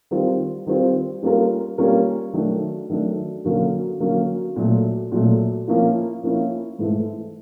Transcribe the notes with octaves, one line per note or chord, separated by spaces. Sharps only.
D#3 G3 C4 F4
D#3 G3 C4 F4
G3 A#3 C#4 F4 A#4
G3 A#3 C#4 F4 A#4
D#3 F#3 A3 D4
D#3 F#3 A3 D4
D3 F#3 A#3 C#4 F#4
D3 F#3 A#3 C#4 F#4
A#2 F#3 A3
A#2 F#3 A3
F3 A#3 C#4 E4
F3 A#3 C#4 E4
G#2 E3 A3